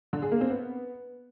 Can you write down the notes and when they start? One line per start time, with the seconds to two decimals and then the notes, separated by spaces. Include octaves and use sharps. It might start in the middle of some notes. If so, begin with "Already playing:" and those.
0.13 D3
0.22 G#4
0.32 A#3
0.41 C4
0.50 B3